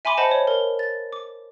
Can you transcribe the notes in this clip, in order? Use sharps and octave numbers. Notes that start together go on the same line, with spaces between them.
E5 G#5 B5 C6 D6
C5 D#5 F#5 A5 B5
C#5
A#4
A6
D6